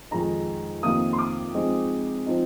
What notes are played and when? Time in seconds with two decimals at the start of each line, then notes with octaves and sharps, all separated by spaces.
0.11 F2 D#3 G#3 D#4 A#5
0.83 F2 C3 D#3 A#3 F4 D#6
1.13 C6
1.19 D6
1.54 C3 F3 G#3 C4 D#4
2.26 F3 C4 D#4